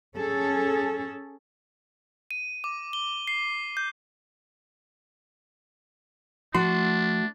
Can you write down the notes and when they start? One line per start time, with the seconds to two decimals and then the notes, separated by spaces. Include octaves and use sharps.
0.17 C#4 G#4 A4
2.31 D#7
2.64 D6
2.93 G7
3.27 C7
3.77 G6
6.55 F3 A3 D4 F#4 A4 C6